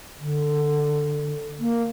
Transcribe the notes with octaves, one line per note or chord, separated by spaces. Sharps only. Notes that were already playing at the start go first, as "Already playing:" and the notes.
D3
A#3